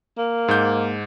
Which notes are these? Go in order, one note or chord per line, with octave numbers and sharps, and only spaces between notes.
A#3
G#2 G6